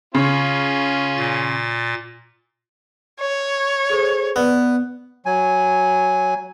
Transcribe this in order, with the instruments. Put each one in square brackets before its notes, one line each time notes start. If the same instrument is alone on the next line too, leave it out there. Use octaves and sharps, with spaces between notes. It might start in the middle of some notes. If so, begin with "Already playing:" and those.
[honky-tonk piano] C#3 [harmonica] C#4 F4
[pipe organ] A#2 A6
[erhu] C#5
[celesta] G#4 A4 C5
[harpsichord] B3 [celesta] B4 D5
[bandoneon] F#3 G#5